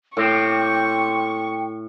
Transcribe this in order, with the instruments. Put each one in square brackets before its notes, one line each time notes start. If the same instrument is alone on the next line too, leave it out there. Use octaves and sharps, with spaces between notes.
[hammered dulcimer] A2 [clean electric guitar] A#3 C4 G4 [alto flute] G5 [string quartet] C#6